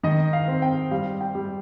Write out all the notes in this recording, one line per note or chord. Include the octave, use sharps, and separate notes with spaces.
D#3 D#5
F5
C4
G5
G3 F5
G5
G3